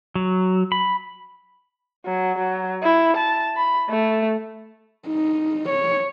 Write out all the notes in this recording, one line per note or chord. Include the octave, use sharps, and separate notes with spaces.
F#3
B5
F#3
F#3
E4
A5
B5
A3
D#4
C#5